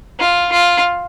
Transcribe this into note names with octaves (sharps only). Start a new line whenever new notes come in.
F4
F4